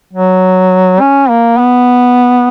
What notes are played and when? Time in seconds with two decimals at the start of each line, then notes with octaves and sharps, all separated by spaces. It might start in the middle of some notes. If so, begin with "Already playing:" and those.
0.13 F#3
1.00 C#4
1.30 A#3
1.59 B3